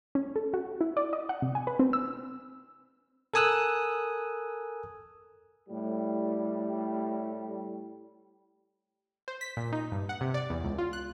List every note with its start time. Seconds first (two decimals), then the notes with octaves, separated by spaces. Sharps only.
0.15 C#4
0.36 A4
0.54 F#4
0.81 E4
0.97 D5
1.13 D#5
1.29 F#5
1.42 C3
1.55 G#5
1.67 B4
1.79 C4
1.93 E6
3.34 A4 A#4 G#5 D#6 E6 F#6
5.67 A2 G3
9.28 C5
9.41 B6
9.57 A#2
9.72 D#4
9.92 G2
10.09 F#5
10.21 C3
10.34 D5
10.50 E2
10.64 C#2
10.78 F4
10.93 F#6